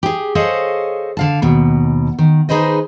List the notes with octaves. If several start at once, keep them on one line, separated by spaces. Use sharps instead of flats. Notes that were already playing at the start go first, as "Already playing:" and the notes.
G4 G#4
G#4 A4 C5 C#5 D#5 F5
D3 F5 A5
D#2 B2
D#3
D#4 G#4 B4 C5 D#5